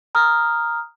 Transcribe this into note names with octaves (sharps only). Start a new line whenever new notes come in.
A#5 D#6 F6